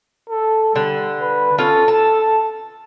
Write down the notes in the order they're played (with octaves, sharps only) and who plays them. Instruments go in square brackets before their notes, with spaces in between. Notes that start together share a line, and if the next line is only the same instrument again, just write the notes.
[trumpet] A4
[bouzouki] D3 [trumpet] G3
[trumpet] B4
[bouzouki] C#4 F4 [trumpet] A4
[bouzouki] A5